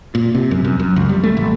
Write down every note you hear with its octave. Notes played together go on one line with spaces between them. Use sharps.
A#2
C3
F#2
F#2
F#2
C#2
G3
A3
A1